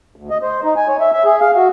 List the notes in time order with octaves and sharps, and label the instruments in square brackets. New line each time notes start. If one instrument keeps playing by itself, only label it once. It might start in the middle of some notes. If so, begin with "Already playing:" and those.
[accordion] D2
D#5
C5
D#4
G#5
C#5
E5
E5
G#4
F5
F#4